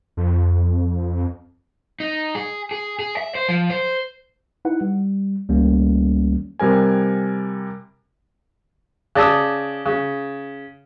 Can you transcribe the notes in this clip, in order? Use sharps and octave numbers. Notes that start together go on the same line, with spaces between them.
F2
D#4
G#4
G#4
G#4
E5
C5
F3
C5
D#4 E4 B4 F#5
G3
C#2 D#3 G3 A3 A#3 C#4
C3 G3 A#4 G#5
C#3 D5 A5 D#6 E6
C#3